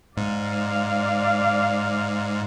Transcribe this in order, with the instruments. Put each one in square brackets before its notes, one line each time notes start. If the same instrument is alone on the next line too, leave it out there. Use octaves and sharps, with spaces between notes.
[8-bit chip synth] G#2 [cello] D5 F5